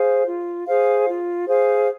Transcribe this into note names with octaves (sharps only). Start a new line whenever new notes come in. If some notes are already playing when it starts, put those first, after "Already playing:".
Already playing: G#4 C5 F5
F4
G#4 C5 F5
F4
G#4 C5 F5